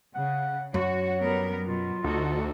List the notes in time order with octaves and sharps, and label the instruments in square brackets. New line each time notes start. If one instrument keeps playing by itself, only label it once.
[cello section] C#3 [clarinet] F#5
[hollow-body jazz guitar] F#2 [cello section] F#4 [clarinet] C#5
[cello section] G3 B3 A#4
[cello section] B2 F#3 [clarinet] F4
[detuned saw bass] D2 [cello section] D#4 F#4 A4